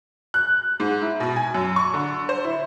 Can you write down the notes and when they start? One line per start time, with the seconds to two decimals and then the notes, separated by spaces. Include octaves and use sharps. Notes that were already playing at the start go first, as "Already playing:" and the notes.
0.34 F#6
0.80 G#2
1.01 E4
1.20 B2
1.36 G#5
1.54 F#2
1.76 C#6
1.94 D3
2.29 C5
2.44 E4